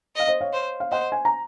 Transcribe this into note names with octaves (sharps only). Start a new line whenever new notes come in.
D#5 F5
C5 D#5
C#5 F5
C5
F5
C5 D#5 F#5
G#5
A#5